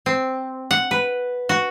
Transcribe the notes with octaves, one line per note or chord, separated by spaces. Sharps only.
C4
F#5
B4
F#4